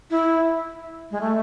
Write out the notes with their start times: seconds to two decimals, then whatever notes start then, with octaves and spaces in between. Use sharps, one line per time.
0.10 E4
1.11 G#3
1.21 A3